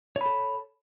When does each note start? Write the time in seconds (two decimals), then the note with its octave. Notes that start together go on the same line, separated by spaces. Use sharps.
0.16 C#5
0.21 B5
0.26 A4